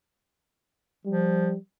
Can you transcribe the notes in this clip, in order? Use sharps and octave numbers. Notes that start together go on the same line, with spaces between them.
F3 G3